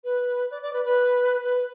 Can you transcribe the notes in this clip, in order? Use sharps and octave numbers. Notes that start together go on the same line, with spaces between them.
B4
D5
D5
B4
B4
B4